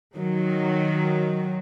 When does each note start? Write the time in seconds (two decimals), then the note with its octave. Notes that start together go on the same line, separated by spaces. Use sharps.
0.16 D#3 F#3